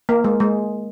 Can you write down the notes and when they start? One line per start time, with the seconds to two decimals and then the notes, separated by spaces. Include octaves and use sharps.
0.09 A#3
0.24 G#3
0.40 G#3